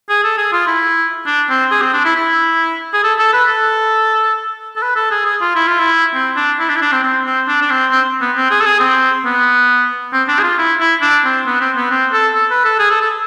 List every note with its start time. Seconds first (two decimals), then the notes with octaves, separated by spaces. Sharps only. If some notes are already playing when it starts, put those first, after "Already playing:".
0.09 G#4
0.24 A4
0.38 G#4
0.52 F4
0.67 E4
1.26 D4
1.49 C4
1.71 G#4
1.82 C4
1.93 D4
2.05 E4
2.16 E4
2.93 G#4
3.04 A4
3.19 A4
3.33 B4
3.49 A4
4.76 A4
4.82 B4
4.96 A4
5.11 G#4
5.25 G#4
5.41 F4
5.55 E4
5.68 F4
5.79 E4
6.14 C4
6.36 D4
6.59 E4
6.69 D4
6.76 E4
6.82 D4
6.92 C4
7.03 C4
7.26 C4
7.47 D4
7.62 D4
7.70 C4
7.91 C4
8.21 B3
8.36 C4
8.51 G#4
8.61 A4
8.66 G#4
8.80 C4
9.25 B3
10.13 C4
10.28 D4
10.39 G#4
10.43 F4
10.58 E4
10.80 E4
11.01 D4
11.25 C4
11.46 B3
11.60 C4
11.76 B3
11.91 C4
12.12 A4
12.35 A4
12.50 B4
12.64 A4
12.79 G#4
12.90 A4
13.01 A4